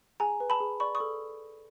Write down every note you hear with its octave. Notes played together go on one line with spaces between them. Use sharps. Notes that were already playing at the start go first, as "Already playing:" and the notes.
G#4 G#5 A#5
B4
A5 B5
G#4
D5 B5 C#6
C#6 D#6
A4